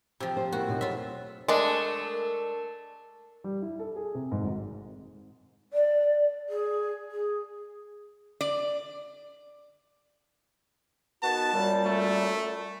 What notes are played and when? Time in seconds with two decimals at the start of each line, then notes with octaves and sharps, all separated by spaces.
0.20 C3 F3 G4
0.37 C5
0.52 A#3 E4 F#4
0.68 D#2 B2 F3
0.81 F#3 F4 E5
1.48 G#3 A3 D4 A#4
3.44 G3
3.62 E4
3.79 A4
3.96 G#4
4.15 C3
4.32 G#2
4.44 G#1
5.73 D5
6.49 G#4
7.11 G#4
8.41 D5
11.23 D#3 B3 F#4 A5
11.54 F#2 A#2 G3
11.85 A3